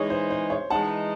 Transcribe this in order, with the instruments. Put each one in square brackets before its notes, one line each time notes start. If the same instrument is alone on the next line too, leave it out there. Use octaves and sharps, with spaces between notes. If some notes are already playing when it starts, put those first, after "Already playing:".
Already playing: [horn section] E3 G#3 D#4 G#4 [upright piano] C#5
[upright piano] C5
C5
C#5
[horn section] E3 G#3 D#4 [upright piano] F#5 A5